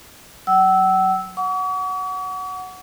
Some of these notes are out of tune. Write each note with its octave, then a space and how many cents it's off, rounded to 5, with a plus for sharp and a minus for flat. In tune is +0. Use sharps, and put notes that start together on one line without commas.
F#3 +0 F#5 +45 E6 -10
F#5 +0 C#6 +45